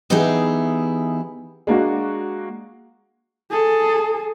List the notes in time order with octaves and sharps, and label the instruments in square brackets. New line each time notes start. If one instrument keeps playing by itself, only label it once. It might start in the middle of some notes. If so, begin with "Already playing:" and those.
[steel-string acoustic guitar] E3 B3 D#4 E4 G4 G#4
[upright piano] G#3 A#3 D4 F#4
[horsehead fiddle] G#4 A4